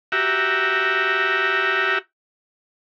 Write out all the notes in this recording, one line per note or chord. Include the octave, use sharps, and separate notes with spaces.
F#4 G4 E5 A#5